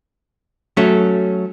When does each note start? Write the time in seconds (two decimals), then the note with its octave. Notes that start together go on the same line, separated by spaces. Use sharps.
0.77 F#3 A3 C#4